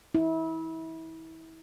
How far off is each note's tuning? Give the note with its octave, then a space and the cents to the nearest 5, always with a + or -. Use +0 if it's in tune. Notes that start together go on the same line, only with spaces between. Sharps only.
E4 -30